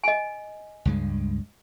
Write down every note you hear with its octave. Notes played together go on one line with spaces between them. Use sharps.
D#5 G#5
C#2 G2 G#3